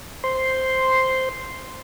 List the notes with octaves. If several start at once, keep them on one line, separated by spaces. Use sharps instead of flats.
C5 C6